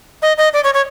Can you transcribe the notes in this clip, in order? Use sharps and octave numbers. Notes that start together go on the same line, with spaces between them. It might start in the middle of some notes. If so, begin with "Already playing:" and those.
D#5
D#5
D5
C#5
C#5